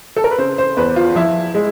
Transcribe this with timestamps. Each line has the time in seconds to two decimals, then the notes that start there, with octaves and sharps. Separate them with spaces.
0.16 A4
0.24 A#4
0.31 B4
0.38 C#3 C5
0.58 C5
0.77 E2 B4
0.96 F4
1.16 F3 E4
1.55 G#3